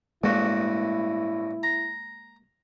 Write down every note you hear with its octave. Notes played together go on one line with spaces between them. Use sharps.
A1 G2 G#3 A#3 E4 F#4
A#5